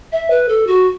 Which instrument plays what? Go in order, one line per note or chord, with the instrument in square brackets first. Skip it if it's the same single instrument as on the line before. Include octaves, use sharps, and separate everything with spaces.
[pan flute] E5
B4
A4
F#4